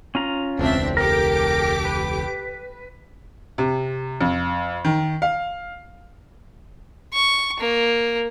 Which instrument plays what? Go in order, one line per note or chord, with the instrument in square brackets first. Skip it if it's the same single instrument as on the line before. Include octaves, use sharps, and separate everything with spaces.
[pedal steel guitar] C#4 F4 A#5
[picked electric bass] E1 C#2 [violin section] C4 D4 E5
[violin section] G4 A4 D6 [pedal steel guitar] A#4
[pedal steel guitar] B4
[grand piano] C3
F2
D#3
F5
[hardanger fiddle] C#6
A#3